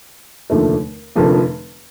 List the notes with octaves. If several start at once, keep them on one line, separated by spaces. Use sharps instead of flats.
F1 D#2 D3 F3 A3
F1 F2 D3 F3 A#3